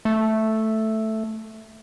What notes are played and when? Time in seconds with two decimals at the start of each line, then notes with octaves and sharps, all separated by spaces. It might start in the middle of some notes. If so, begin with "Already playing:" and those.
0.05 A3